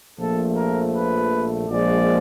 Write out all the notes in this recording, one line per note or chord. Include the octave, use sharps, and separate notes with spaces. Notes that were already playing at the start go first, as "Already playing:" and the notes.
A#1 A#2 F3 A3 A4
A#4
B4
A#1 A#2 F3 G#3 D5